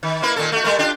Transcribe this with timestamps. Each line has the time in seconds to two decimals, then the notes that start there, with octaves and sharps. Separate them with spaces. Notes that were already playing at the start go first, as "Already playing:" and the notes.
0.03 D#3
0.22 A#3 E4 B4
0.36 A#2 D#3 A4
0.52 A3 F#4
0.64 G3 A3 A#4
0.79 D4 F4 G4